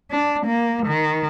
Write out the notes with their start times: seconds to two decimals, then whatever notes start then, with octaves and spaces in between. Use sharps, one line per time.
0.11 D4
0.46 A#3
0.87 D#3